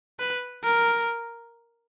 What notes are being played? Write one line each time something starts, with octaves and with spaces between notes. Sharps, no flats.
B4
A#4